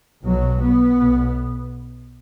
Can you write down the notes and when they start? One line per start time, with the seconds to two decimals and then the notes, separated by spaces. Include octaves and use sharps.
0.22 B1 B2 F#3
0.59 B3
0.96 B1 B2